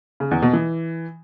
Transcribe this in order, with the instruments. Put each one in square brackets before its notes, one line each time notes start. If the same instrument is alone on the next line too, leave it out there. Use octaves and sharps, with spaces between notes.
[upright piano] C#3
E2
B2
E3